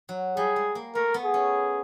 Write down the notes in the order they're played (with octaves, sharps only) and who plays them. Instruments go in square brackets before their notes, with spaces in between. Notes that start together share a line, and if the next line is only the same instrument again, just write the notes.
[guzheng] F#3
[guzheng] G3 [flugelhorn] G#4
[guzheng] G#3
A#3
[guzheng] A3 [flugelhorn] A#4
[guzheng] B3
[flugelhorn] G#4
[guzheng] C#4